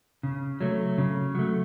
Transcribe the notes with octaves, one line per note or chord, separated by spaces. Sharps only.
C#3
F#3 A3
C#3
F#3 A3